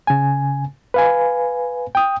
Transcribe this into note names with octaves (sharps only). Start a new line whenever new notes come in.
C#3 G#5
B4 F5 G#5
G5 D#6